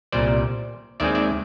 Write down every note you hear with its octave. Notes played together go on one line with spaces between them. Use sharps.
C2 A#2 G3 C5 D5
D#2 D#3 G#3 C4 D5 E5
D5 E5